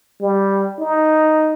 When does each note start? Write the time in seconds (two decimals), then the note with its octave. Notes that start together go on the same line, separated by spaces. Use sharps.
0.21 G3
0.79 D#4